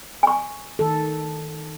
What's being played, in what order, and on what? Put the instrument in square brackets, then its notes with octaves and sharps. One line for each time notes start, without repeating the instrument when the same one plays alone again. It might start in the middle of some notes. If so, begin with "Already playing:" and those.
[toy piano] G#5 C#6
[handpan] D#3 A4